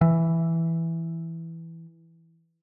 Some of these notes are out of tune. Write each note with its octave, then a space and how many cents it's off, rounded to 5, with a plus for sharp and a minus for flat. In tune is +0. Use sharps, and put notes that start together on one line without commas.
E3 +0